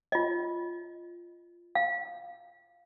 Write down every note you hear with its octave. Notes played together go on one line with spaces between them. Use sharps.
F4 D#5
F5